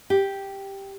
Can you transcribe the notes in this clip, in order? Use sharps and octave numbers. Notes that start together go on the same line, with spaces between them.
G4